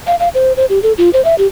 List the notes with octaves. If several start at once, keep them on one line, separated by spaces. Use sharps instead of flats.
F5
F5
C5
C5
G4
A4
F4
C5
E5
G4